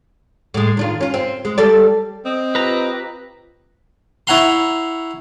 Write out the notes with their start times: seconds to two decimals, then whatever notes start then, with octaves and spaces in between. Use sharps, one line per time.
0.54 A2 G#3
0.77 D#3 D4 F4
1.00 C#4 F4
1.14 C4
1.45 G#3
1.58 G3 A4 D5
2.25 C4 D#5
2.55 F4 G4 B4 A#5
4.27 E4 C#5 F#5 A#5 C6